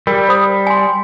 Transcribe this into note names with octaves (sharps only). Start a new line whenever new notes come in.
G3 A#4
C5 B5 D#6
G#5 C6